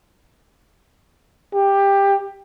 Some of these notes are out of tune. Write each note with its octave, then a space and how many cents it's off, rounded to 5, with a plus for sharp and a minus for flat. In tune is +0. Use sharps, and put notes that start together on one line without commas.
G4 +15